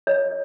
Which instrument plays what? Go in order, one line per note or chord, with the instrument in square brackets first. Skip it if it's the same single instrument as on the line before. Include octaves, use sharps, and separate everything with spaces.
[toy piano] C#5 [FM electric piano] D#5